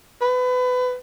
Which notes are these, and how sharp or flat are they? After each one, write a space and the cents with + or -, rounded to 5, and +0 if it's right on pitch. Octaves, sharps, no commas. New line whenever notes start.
B4 +25